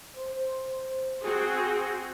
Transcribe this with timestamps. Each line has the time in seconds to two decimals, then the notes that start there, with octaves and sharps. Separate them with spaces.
0.17 C5
1.23 C4 F#4 G#4